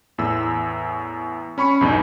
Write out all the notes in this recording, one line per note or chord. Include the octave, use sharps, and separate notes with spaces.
E2 A2 E6
C#4 B5 C#6 C#7
B1 E2 G2 D#4